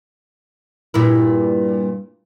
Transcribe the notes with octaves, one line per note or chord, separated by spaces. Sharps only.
G2 A#2 E4